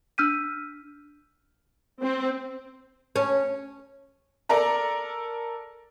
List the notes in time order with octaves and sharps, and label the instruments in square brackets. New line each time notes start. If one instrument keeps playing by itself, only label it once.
[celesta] D4 E6 F6 G6 B6 D#7
[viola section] C4
[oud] C#4
[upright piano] A4 A#4 D5 A#5